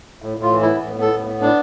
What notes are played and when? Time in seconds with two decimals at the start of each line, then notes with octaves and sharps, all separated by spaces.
0.22 A2
0.38 A2 F4
0.52 E3
0.62 E4
0.67 B3
0.81 A2
0.97 B3 A4
1.12 A2
1.27 B3
1.41 D4